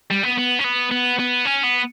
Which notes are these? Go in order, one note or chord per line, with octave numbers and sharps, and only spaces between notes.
G3
B3
B3
C#4
B3
B3
B3
C#4
B3